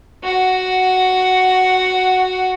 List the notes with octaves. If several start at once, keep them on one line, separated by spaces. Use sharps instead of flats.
F#4 F#5